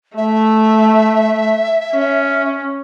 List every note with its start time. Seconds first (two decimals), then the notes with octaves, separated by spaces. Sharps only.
0.17 A3 E5
1.93 C#4